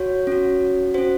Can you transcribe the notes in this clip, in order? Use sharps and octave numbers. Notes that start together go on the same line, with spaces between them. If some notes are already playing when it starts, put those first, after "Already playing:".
Already playing: F#4 C#5
C#4 F#4
C#4 F#4 C5